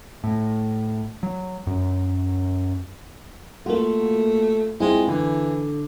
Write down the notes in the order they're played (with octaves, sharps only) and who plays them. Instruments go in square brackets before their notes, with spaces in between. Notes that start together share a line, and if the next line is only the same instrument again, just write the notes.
[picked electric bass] A2
F#3
F#2
[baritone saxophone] A3 [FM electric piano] A#3 F#4 [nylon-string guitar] F4
[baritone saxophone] G#3 [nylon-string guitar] C4 F4 [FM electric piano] E4
[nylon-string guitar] D3 [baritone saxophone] E3